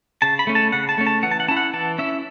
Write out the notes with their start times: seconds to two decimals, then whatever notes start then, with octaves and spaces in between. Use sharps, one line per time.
0.22 C#3 A5
0.39 B5
0.47 A3 C#4
0.55 A5
0.72 C#3 F#5
0.89 A5
0.98 A3 C#4
1.07 A5
1.23 E3 F#5
1.31 A5
1.40 F#5
1.48 C#4 E4 A5
1.57 F#5
1.74 E3 A5
1.98 C#4 E4 E5